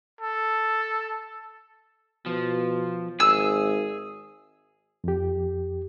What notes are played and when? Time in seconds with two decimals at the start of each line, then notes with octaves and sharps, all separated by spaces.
0.21 A4
2.26 B2 F3
3.20 G#1 G#4 E6
5.04 F2 G4